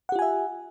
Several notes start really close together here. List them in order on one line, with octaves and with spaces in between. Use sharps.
F#5 G4 F4 G#5 E5